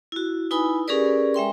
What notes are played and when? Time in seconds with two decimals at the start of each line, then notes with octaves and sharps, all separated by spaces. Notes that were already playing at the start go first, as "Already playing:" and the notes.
0.12 E4 F#4
0.51 D#4 E4 B4 G#5 B5 D#6
0.88 C#4 G4 G#4 A#4 B4 D5
1.34 G#3 E5 G5 C6